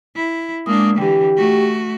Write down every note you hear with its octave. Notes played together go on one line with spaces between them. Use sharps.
E4
G#3 A#3 D4 D#6
D3 E3 G4 G5
A3 F#4